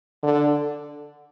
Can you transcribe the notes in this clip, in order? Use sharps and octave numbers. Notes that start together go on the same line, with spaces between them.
D3